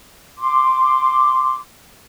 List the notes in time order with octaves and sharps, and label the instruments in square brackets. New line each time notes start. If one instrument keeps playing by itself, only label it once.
[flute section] C6 D6